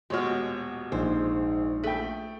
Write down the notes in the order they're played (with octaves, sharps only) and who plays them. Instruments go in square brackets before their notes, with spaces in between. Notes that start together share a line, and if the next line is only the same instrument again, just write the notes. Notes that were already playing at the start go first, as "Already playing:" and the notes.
[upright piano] D#1 C#5 F6 [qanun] B2 G#3
[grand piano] A#1 [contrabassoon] G#2 [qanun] C5
[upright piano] A3 G5 [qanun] B4